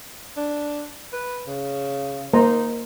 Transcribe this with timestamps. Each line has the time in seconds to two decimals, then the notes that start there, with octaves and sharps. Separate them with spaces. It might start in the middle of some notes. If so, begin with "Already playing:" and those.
0.37 D4
1.13 B4
1.47 C#3
2.34 A#3 D#4 C5 A#5